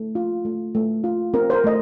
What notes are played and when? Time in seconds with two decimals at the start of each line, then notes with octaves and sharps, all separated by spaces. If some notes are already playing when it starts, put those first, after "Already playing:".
Already playing: A3
0.15 F4
0.45 A3
0.75 A3
1.04 F4
1.34 C4 A#4
1.50 C5
1.53 A#4
1.64 A3 D#5